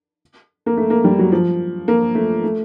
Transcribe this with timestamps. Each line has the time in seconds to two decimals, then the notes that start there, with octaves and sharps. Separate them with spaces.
0.66 A#3
0.77 A3
0.90 A#3
1.04 G3
1.19 F#3
1.32 F3
1.88 A#3
2.15 A3
2.44 A3